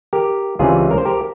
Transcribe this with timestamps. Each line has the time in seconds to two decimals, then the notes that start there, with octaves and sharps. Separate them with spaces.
0.13 G4 A#4
0.59 C#2 C3 E3 G3 C#4 F4 G#4
0.91 A#4
0.98 C5
1.05 G4 A#4